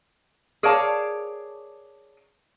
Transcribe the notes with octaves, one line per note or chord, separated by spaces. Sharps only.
G#4 A#4 C#5 D5 F5 A5